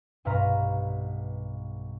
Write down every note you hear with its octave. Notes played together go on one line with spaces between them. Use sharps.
B1 G2 B4 F5 A#5 C6